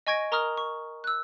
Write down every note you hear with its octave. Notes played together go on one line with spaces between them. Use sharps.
D#5 G#5 C#6 G#6 A#6 D7
A#4 A#5 C#6 D#6 F6
C#6
E6 F#6